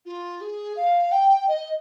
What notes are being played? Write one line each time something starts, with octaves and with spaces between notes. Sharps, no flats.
F4
G#4
F5
G5
D#5